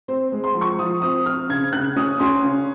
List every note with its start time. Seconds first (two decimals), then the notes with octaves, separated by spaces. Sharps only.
0.08 C4 C5
0.32 G#3
0.44 C6
0.54 F3
0.61 C#6
0.79 F3 D#6
1.02 C4 D#6
1.26 C4 F6
1.49 C#3 G#6
1.73 C#3 F#6
1.96 C#4 D#6
2.20 C#4 C6
2.44 C#3